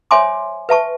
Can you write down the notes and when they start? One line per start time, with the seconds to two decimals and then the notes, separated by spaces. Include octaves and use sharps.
0.11 C5 C#5 E5 G#5 C6 D6
0.69 B4 E5 A5 C#6